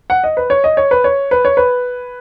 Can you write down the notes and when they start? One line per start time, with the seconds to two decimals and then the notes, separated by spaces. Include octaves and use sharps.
0.10 F#5
0.24 D#5
0.37 B4
0.50 C#5
0.64 D#5
0.77 C#5
0.91 B4
1.04 C#5
1.31 B4
1.45 C#5
1.57 B4